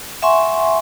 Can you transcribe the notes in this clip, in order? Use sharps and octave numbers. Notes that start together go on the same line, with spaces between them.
E5 F#5 G#5 C6 C#6